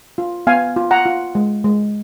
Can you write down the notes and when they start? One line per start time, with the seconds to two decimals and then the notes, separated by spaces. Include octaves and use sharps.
0.18 F4
0.47 B3 F5 G#5
0.76 F4
0.91 F#5 A#5
1.06 F4
1.35 G#3
1.64 G#3